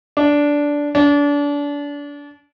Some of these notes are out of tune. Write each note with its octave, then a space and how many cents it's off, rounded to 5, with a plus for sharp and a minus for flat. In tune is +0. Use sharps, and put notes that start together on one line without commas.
D4 -10
D4 -30